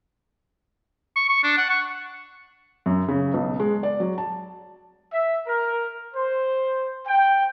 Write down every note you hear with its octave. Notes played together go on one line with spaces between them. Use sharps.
C#6
C#6
D4
F#5
C#6
F#2
C#3
B1
G#3
D5
F#3
A5
E5
A#4
C5
G5